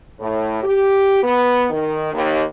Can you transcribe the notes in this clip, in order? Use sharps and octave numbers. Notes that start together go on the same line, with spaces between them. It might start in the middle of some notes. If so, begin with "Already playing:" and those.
A2
G4
B3
D#3
D#2